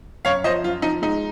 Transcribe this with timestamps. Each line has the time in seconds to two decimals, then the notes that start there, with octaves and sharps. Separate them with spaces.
0.25 F#2 C#5 F5
0.44 F3 C5 D#5
0.64 F#2 F4
0.82 F3 D#4
1.02 G#3 D#4